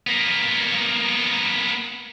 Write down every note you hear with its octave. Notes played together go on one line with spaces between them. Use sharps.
A#3 B3